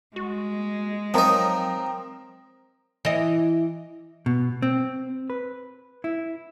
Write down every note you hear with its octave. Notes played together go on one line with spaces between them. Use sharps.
G#3 F#4
F3 F#3 C4 D#4 A#4
E3 D#5
B2
C4
B4
E4